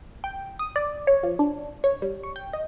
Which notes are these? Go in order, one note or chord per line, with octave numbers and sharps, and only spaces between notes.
G5
D#6
D5
C#5
F3
D4
C#5
G3
C#6
G5
D#5